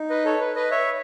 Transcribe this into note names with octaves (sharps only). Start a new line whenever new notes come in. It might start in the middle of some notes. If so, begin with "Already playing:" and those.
Already playing: D#4
B4 D#5
A4 C#5
B4
B4 D#5
C#5 E5